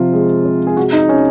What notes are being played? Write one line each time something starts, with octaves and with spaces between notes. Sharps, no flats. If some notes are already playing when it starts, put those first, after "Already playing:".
Already playing: C3 F3 F4
G#3
C3
G#4
G#3 F#4
D#4
G#3 C#4